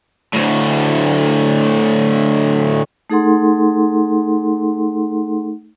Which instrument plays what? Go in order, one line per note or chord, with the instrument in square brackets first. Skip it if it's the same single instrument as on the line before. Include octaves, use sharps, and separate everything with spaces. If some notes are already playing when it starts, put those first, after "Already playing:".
[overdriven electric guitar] D2 A2
[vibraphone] A3 D#4 G#4 A4 F#5 C6